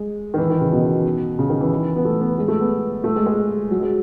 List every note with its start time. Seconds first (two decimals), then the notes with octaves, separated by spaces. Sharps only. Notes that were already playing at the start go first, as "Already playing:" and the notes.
Already playing: G#3
0.34 D#3
0.38 E3
0.50 D#3
0.61 C#3
0.72 B2
1.39 C#3
1.49 D#3
1.61 E3
1.96 B3
2.05 A3
2.21 B3
2.38 G#3
2.48 A3
2.61 B3
3.04 A3
3.16 G#3
3.26 G#3
3.71 F#3
3.82 G#3